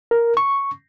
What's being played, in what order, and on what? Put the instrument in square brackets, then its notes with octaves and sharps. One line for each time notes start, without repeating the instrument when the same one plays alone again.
[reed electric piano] A#4
C#6